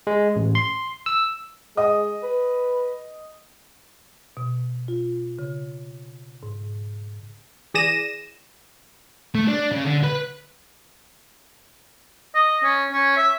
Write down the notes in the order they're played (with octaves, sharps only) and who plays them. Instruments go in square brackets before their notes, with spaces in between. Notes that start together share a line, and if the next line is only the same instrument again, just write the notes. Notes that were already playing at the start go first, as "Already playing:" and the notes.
[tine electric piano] G#3
A1
C6
E6
[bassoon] G#3 [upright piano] D#5 D#6
[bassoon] B4
[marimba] B2
F4
C#3
G#2
[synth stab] E3 G#4 D5 A#6 D#7 E7
[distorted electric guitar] A3
D4
C#3
D3
B4
[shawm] D#5
C#4
C#4
E5